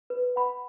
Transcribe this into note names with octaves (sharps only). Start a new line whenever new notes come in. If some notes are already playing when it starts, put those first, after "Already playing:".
B4
F#5 B5